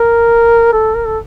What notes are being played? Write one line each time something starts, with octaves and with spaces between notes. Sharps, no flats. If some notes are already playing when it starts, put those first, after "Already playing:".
Already playing: A#4
A4
A#4
A4